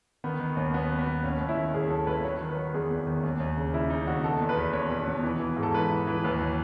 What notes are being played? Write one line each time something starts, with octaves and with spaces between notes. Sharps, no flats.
D#3 B3
D#3
D#2
F#3 B3
F#3
B3
D#2
D#2 C#4
D#2
E4
D#3
D#2 G#4
F#3 A4
D#2 B4
F#3 C#5
D#3
B4
F#3
E2 G#4
E2
D#3
D#2
D#2
C#3
C#3 E4
C#3 D#4
D#2 F#4
B2 A4
E2
B4
E2
E2 C#5
B2
B2
E3
E3
G#2
A4
E3 B4
E3
E3
D#2 B4
F#3